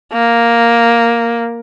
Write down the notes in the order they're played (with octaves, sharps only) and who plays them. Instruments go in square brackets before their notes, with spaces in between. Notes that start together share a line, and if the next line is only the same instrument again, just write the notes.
[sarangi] A#3